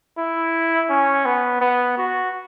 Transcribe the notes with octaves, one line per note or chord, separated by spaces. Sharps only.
E4
C#4
B3
B3
F#4